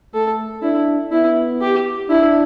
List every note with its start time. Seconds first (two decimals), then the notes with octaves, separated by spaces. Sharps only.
0.14 A3 A4
0.62 D4 E4
1.12 B3 E4
1.61 G4
2.09 D4 E4